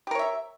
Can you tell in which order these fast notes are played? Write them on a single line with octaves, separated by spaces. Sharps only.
G4 A#4 C#5 E5